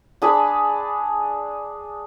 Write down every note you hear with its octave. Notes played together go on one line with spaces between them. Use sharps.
D4 G#4 B5